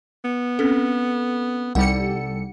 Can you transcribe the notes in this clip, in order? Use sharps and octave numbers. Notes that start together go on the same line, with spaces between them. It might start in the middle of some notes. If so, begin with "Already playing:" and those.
B3
C4 C#4 A4
C2 G3 D#4 A4 F#5 C#7